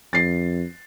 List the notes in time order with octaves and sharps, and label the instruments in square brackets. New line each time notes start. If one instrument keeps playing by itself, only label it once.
[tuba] F2 [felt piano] A6 C7